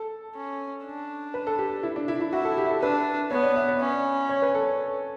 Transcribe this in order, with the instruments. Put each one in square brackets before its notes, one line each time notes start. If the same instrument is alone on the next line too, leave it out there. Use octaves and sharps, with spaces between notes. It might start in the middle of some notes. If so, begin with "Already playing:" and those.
Already playing: [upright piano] A4
[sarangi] C#4
D4
[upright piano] B4
A4
G4
E4
D4
E4
E4
[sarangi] E4 [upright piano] F#4
[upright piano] A4
G4
A4
[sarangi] D4 [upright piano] B4
[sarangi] B3 [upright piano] C#5
[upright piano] D5
E5
D5
[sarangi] C#4
[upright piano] C#5
B4
A4